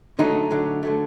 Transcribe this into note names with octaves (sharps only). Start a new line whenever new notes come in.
D3 F#3 A3 D#4
D3 F#3 A3
D3 F#3 A3